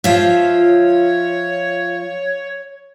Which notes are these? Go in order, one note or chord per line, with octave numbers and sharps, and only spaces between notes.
F3 F4 C#5 E5